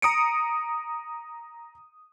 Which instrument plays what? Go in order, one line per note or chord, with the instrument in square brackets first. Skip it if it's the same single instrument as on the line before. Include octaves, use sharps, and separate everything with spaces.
[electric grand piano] A#5 D#6 C#7 D7